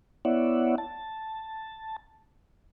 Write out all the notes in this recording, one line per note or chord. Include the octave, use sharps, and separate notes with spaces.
B3 E4 C#5 D5 E5 F#5
A5